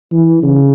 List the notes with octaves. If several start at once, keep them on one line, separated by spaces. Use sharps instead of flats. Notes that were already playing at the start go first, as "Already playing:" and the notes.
E3
C#3